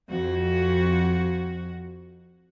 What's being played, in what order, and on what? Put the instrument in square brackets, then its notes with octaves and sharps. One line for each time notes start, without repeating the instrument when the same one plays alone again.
[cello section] F2 F#4